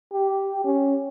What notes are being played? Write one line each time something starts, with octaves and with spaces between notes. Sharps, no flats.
G4
C#4